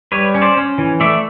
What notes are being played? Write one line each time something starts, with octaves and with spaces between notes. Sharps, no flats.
G3 B4 C#5
C#4
C5 D5
C#4
E3
A3 D5 E5